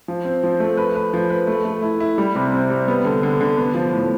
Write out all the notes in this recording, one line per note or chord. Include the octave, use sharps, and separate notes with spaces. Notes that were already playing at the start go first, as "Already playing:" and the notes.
F3
C4
F3
A3
B4
B4
F3
B4
A3
A3
E4
E4
G3
C3
C4
G3
B3
D3
D3
D3
B3
F3
A2